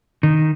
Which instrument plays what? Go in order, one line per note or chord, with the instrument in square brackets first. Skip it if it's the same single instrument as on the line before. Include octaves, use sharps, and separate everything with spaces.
[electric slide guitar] D#3